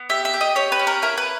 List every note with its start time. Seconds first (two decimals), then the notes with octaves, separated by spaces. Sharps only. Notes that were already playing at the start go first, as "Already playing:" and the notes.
Already playing: B3
0.09 G4 E5
0.25 E5
0.34 G4
0.41 D#5
0.56 G4 C#5
0.72 B4
0.79 C#4
0.87 A#4
1.02 E4 A#4
1.18 B4